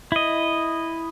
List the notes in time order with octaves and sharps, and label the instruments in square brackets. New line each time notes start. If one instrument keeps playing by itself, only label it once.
[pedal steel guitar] E4 D#5